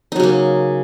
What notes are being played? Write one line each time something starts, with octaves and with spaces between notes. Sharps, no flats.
C#3 F#3 A#3 D#4